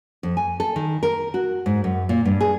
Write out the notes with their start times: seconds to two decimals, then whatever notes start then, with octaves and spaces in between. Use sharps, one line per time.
0.23 F2
0.37 G#5
0.60 A4
0.76 D#3
1.03 A#4
1.34 F#4
1.66 G#2
1.84 F#2
2.09 A#2
2.25 G2
2.41 G#4